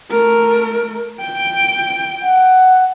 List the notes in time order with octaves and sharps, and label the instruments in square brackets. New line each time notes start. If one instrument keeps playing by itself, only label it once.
[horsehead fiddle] A3 A#4
G5
[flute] F#5